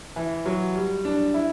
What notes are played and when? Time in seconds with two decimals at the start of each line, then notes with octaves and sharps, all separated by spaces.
0.16 E3
0.46 F#3
0.75 G3
1.05 D4
1.34 E4